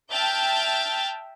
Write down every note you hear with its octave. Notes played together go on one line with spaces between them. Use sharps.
E5 G5 A5 F6 G6 A6